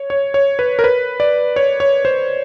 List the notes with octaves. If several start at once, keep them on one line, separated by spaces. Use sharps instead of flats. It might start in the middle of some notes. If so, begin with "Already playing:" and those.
Already playing: C#5
C#5
C#5
B4
A#4
B4
D5
C#5
C#5
C5